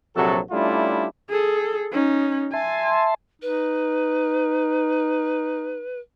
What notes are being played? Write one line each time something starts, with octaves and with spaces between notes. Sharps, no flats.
A#1 C3 F#3 F#4 A4
G3 A3 C#4 D4 E4 F4
G#4 A4
C#4 D#4
E5 G#5 A5 C6
D#4 B4